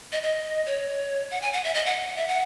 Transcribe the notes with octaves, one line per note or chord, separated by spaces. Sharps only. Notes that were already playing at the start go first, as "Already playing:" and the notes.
D#5
D#5
C#5
F#5
G#5
F#5
E5
D#5
F#5
E5
F#5